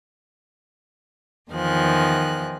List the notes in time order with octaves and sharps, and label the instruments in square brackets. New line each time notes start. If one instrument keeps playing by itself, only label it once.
[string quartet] E2 D#3 F3 G#5 F#6